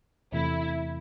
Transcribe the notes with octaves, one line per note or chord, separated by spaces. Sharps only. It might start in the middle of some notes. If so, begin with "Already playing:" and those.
E2 C3 E3 A3 E4